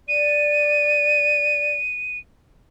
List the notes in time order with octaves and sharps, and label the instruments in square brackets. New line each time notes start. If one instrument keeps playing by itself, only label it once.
[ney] D5 [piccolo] D#7